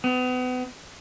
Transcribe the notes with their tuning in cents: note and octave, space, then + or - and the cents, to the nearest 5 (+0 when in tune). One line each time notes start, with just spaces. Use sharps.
B3 +35